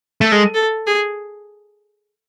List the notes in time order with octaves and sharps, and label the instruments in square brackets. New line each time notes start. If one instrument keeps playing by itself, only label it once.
[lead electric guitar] A3 [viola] A4
[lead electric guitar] G#3
[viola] A4
G#4